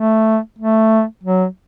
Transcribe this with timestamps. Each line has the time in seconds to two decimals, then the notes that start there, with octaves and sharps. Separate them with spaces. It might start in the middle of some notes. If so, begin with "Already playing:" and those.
Already playing: A3
0.58 A3
1.23 F#3